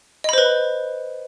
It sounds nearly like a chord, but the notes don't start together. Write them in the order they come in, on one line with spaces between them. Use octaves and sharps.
D#5 B5 C5 B4